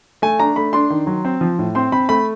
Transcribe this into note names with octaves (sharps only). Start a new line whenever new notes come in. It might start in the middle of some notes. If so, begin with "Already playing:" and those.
A3 G#5
D4 A#5
A3 B5
D4 C6
D#3
F#3
C4
F3
A2
C4 C6
C4 B5
A3 B5